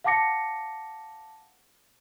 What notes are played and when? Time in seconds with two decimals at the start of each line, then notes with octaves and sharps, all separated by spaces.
0.04 F5 F#5 A5 D6 A#6 C#7